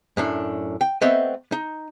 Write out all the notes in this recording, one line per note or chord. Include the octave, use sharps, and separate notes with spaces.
F#2 A2 D4
G5
A3 B3 C4 D#5 E5
D#4